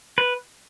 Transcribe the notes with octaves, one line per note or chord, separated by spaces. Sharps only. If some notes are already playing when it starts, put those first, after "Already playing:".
B4